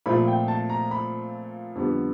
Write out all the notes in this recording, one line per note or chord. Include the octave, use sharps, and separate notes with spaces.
A#2 F3 A3 C4 B5
G5
A5
A#5
B5
F2 D3 G3 B3